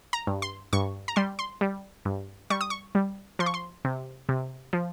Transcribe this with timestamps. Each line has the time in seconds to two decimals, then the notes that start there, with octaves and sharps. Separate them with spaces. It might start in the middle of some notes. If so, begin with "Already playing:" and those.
0.13 A#5
0.27 G2
0.42 C6
0.73 G2 C#6
1.08 A#5
1.16 G3 C6
1.39 C6
1.61 G3
2.05 G2
2.50 G3 C#6
2.61 D#6
2.70 C#6
2.95 G3
3.39 F3 C6
3.46 C#6
3.54 C6
3.85 C3
4.29 C3
4.73 F3